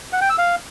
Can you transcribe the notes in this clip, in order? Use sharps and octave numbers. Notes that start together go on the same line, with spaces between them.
F#5
G5
E6
F5